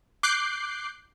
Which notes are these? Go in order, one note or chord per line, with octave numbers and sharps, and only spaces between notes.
D6 F#6 G6 C7